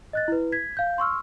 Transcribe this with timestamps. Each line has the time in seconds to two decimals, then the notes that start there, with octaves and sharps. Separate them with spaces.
0.13 D#5 F#6 A6
0.28 E4 B4
0.52 G#6 B6
0.77 F5 G6
0.98 C6 C#6 E6 F6